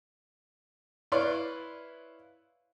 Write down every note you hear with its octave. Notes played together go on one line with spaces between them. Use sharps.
E4 B4 C#5 D5 F5 C6